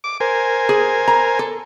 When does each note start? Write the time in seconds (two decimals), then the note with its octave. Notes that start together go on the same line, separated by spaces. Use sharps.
0.04 D6
0.20 A#4 C5 G#5
0.69 G#4
1.08 A#5
1.39 A4